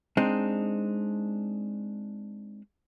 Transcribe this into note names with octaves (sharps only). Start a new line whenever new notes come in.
G#3 C4 D4 D#4